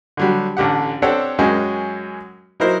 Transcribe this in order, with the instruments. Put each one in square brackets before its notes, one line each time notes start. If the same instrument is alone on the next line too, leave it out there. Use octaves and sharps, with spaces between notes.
[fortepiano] D3 F#3 G3
A1 D3 G4 F#5
C4 D4 G4 A4 C#5 F#5
F#2 G#3 C#4 F#4 A#4 G5
F#3 D#4 E4 A#4 C5